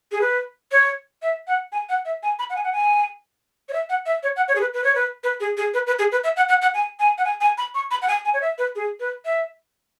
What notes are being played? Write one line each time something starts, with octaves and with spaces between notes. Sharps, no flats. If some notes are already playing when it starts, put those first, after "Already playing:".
G#4
B4
C#5
E5
F#5
G#5
F#5
E5
G#5
B5
F#5
G#5
F#5
G#5
C#5
E5
F#5
E5
C#5
F#5
C#5
G#4
B4
B4
C#5
B4
B4
G#4
G#4
B4
B4
G#4
B4
E5
F#5
F#5
F#5
G#5
G#5
F#5
G#5
G#5
B5
C#6
B5
F#5
G#5
G#5
C#5
E5
B4
G#4
B4
E5